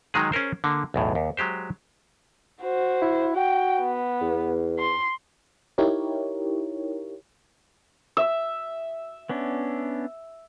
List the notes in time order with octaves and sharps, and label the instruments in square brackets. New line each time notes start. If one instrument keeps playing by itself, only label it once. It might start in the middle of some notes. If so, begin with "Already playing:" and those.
[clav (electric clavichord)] D#3 F#3 G#3 D#4 G#4
C#4 G#4 A#4 C5
D3 A#3
B1 E2 A2
D#2
F#3 G#3 G4 C5
[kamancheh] F#4 C5
[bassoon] E4
[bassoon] F#4 [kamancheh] G5
[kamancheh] B3
[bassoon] E2
[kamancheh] C6
[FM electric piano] D#4 E4 G4 A#4 C#5
[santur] E5
[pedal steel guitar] B3 C#4 D4